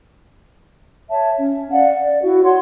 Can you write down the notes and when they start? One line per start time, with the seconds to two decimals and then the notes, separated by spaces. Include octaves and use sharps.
1.10 C#5 E5 A5
1.38 C#4
1.71 D5 F5 F#5
2.00 D5
2.24 E4 F#4
2.44 C#5 F#5 C6